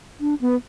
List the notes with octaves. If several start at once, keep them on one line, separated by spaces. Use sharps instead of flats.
D4
B3